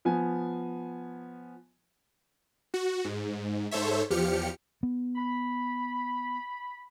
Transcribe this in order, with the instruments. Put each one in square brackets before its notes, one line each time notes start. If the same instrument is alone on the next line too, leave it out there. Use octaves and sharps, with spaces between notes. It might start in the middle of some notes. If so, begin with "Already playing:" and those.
[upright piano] F3 B3 G#5
[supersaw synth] F#4
G#2
G#2 A4 C5 C#5 E5
E2 F3 G4 F6 C#7
[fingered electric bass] B3
[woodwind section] B5